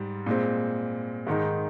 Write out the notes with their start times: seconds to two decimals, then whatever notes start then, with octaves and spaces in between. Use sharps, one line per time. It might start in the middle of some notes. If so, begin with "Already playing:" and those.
Already playing: G#2 G3
0.26 A#2 G#3 C4
1.27 G#2 D#3 G#3 D#4